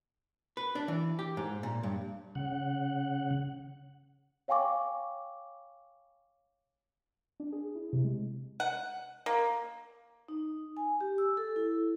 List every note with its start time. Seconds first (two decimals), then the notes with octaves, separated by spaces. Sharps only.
0.57 B4
0.75 D4
0.88 E3
1.19 G4
1.37 G#2
1.63 A#2
1.83 G2
2.35 C#3 F#5
4.48 C#5 F5 G5 G#5 C#6 D6
7.40 D4
7.52 G#4
7.75 E4
7.93 C3
8.04 G#3
8.60 F#5
9.26 A#3
10.28 D#4
10.77 G#5
11.01 G4
11.18 E6
11.37 A4
11.56 E4